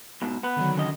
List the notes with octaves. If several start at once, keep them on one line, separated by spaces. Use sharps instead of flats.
G#2 B2
B3 B4
D3 D#3 F#3
C#3 D#5